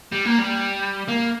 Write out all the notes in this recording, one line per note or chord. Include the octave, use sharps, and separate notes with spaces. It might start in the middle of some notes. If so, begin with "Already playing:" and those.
G3
A#3
G3
A#3